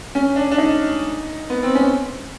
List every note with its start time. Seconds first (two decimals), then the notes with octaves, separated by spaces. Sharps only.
0.15 C#4
0.36 D4
0.51 D4
0.58 D#4
1.50 B3
1.63 C4
1.75 C#4